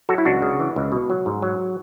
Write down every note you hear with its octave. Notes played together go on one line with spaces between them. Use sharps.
F#3 F#4 A4
E4
C#2 D4 F#4
C#3
E3
C#2
B2
F#3
G#2
F#3